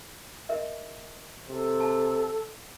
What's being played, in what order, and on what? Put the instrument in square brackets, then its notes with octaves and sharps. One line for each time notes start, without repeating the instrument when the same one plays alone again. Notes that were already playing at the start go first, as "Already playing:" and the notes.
[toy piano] A#4 D#5 E5
[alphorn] C3 [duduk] A4
[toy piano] A5